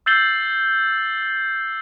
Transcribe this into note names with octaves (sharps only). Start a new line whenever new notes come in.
E6 G6 A6 C7 F#7 G7